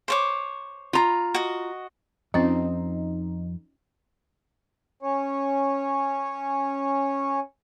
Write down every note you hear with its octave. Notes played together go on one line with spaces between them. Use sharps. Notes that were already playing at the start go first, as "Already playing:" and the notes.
C5 C#5 D6
F4 A#5
F#4 D#5
F2 C4 C#4 D#4 F4
C#4 C#5